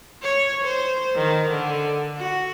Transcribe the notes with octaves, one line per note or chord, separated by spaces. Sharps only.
C#5
C5
D#3
D3
F#4